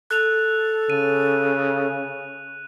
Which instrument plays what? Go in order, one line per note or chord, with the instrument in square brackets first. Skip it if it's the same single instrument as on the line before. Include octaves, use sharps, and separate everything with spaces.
[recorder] A4 [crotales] F#6 F7
[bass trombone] C#3 [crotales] D#7